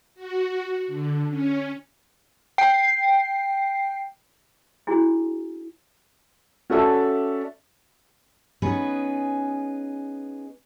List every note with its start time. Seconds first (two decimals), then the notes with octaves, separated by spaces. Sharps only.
0.15 F#4
0.87 D3
1.29 C#4
2.58 G5 C7
4.87 C#4 D4 E4 F#4 G#4
6.70 C#4 F#4 A4 D5 E5 A5
8.62 B3 C#4 D#4 G#4 B4